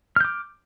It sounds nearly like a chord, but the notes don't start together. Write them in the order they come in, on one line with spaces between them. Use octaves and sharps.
F6 G6 D6